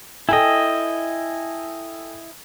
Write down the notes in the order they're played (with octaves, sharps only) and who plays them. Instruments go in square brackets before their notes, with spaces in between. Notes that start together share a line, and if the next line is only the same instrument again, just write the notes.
[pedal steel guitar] E4 D#5 [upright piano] A4 G5 G#5